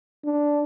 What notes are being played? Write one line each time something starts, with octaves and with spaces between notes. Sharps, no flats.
D4